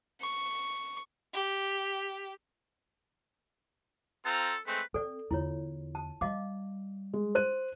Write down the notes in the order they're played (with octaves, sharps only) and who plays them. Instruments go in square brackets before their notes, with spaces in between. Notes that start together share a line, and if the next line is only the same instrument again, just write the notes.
[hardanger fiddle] C#6
[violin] G4
[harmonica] C4 F4 A#5 [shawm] A4
[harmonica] G#3 A3 C4 [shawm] B4
[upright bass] C4 [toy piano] A4 D5
[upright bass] E2 D3 [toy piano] E4 F4 C#5
[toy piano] A5
[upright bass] G3 [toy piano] D#5 F5 D6
[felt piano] G#3
C5 F#6 D#7